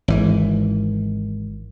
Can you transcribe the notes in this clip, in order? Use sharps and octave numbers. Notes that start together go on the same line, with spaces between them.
G#1 E3